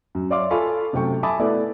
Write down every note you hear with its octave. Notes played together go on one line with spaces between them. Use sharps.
F#2
C#5 D5 E5 F5 C6 D6
F4 A4 F5 G#5 B5 C#6
F#2 C3 A3 G5 C#6
E5 G#5 A5 B5 D6 D#6
A3 B3 E4 D5